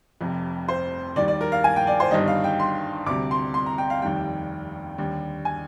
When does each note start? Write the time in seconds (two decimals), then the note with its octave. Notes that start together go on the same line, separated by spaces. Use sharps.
0.21 F1 F2 C3
0.68 C5
1.16 D#2 D#3 G3 D5
1.28 D5
1.41 A#4
1.52 F5
1.64 G#5
1.76 G5
1.87 D5
2.00 C5
2.11 G1 G2 D#3 G3 D#5
2.28 F5
2.44 G5
2.60 C6
3.06 D2 C3 G3 D6
3.31 C6
3.54 C6
3.66 A#5
3.78 G5
3.90 F5
4.02 F1 D#2 D#3 G3 G5
4.98 D#2 D3 G3
5.45 G#5